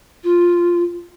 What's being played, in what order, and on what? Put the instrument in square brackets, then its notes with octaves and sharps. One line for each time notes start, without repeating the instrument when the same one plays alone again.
[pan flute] F4